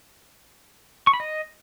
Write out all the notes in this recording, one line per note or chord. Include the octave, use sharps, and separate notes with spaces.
C#6
B5
D#5